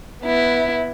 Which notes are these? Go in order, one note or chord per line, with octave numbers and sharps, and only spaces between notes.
B3 E4